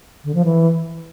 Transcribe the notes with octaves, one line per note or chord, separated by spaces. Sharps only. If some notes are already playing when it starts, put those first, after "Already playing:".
D3
F3
E3